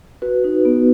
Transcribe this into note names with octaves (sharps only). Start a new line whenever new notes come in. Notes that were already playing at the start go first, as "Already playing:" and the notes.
F#4 B4
D#4
B3